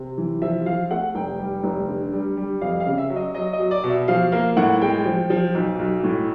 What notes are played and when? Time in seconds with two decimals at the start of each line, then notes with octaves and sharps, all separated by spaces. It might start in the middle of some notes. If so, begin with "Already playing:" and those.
Already playing: C3
0.18 E3
0.42 F3 E5
0.66 F3 F5
0.90 A3 F#5
1.15 F1 G5
1.39 G3
1.64 F1
1.89 D3
2.13 G3
2.37 G3
2.61 F2 F5
2.80 F5
2.86 C#3
2.98 E5
3.10 F#3
3.16 D#5
3.34 F#3 D#5
3.53 D#5
3.59 F#3
3.71 D5
3.83 B2
3.90 E5
4.08 F3 F5
4.32 A#3 F5
4.57 A2 F#5
4.81 G#3 G5
5.06 F3
5.30 F3
5.55 B1
5.79 B1
6.04 A2